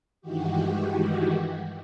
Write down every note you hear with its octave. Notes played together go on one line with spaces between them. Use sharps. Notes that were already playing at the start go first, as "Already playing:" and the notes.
G2 D#3 E3 G#3 F#4 G4